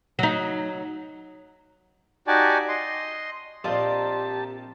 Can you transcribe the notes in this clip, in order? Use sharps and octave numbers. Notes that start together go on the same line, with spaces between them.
F#3 D#4
D#4 F#4 G4 D5 G#5 A5
D#5 C6
A#1 C4 F4 G4 A#4 D5 D#5 A5